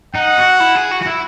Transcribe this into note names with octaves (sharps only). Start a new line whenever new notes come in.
D#4 F#5
F#4
E4
G#4
F#4
F#4
E4